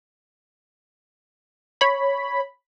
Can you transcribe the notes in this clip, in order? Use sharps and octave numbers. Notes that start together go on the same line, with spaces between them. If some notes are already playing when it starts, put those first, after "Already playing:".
C#5 B5